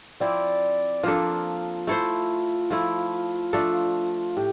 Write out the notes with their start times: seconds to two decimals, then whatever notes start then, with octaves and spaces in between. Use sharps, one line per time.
0.20 F3 C4 E4 D5
1.03 F3 A#3 D4 F4 A4
1.87 A3 E4 A4 C5
2.70 F3 A3 E4
3.53 F3 A3 D4 A4
4.37 A2 G4